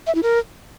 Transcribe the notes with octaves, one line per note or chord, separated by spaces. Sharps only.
E5
E4
A#4